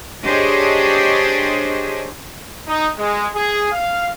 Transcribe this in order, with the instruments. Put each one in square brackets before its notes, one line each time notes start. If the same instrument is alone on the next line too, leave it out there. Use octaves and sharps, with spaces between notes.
[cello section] D4 G4 G#4 C5 C#5 D#5
[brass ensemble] D#4
G#3
G#4
F5